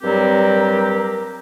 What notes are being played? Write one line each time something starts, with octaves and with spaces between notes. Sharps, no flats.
G2 F#3 G3 C4 G4 A#4